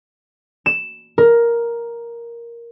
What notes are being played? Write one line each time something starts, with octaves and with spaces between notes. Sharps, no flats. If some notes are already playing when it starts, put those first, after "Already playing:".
E7
A#4